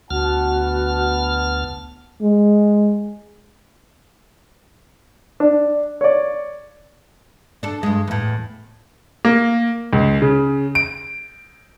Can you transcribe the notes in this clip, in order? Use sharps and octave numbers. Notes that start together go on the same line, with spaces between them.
D2 B3 F#4 F#5 A5 F6
G#3
D4
C#5 D5
D4 A4
G2 G#3
E2 A2
A#3
C#2
C#3
D7